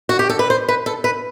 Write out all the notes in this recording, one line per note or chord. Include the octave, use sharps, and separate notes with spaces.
F#4
G4
A4
B4
C5
B4
A4
B4